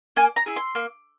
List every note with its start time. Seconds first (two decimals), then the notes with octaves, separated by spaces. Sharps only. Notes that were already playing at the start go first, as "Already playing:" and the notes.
0.16 A#3 G#5
0.36 A#5
0.46 E4 G#4
0.56 C6
0.75 A#3